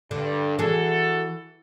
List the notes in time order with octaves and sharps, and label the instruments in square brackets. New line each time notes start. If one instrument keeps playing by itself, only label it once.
[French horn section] G2 [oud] D3
[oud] E3 G#4 [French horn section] F#4 A4